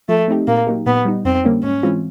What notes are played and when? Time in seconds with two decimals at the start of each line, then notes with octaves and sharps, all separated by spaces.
0.09 F3 A3
0.28 A3 C4 D#4 G4
0.47 A#2 A#3
0.67 F#3 A#3 D#4 G4
0.86 A#2 B3
1.05 G3 B3 D#4
1.25 F2 C4
1.44 D3 G3 A#3 C#4
1.63 G#2 C#4
1.83 E3 G#3 C4 F4